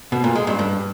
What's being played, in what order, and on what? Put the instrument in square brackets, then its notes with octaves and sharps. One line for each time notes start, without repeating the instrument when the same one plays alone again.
[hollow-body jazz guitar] B2
A#2
G#3
G2
G2